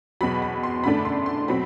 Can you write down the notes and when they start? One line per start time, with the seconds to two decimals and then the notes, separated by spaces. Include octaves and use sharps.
0.21 E2 B2 F#3 B5
0.42 B5
0.63 C6
0.84 F#2 D3 A3 D4 B5
1.05 C6
1.26 C6
1.48 B2 F#3 C4 B5